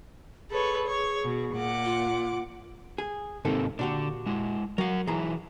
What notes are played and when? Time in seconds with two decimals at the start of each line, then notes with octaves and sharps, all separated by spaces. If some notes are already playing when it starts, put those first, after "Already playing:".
0.50 G#4 A4 B4 C#5
0.86 C#5
1.25 B2
1.54 A#2 F#5 D6
1.85 F4
2.98 G#4
3.45 G#2 C3 D#3 A#3 C4 A4
3.79 A#2 D3 D4 F#4 G4
4.26 G#3 E4
4.78 F#3 A#4 F5 F#5
5.07 E3 F#3 E4 G#4 A#5